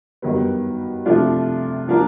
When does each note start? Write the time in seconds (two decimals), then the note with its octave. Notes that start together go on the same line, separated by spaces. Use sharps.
0.22 G2 D#3 F#3 B3
1.06 C3 F3 A3 D4 F4
1.88 F3 A#3 D4 F4 A#4